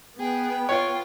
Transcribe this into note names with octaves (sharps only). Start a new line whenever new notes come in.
B3 G#4 G5
F4 C#5